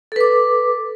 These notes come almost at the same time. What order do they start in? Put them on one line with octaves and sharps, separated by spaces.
A4 B4 D6